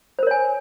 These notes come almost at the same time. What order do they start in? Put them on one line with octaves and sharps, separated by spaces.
C5 A#4 C#5 G#5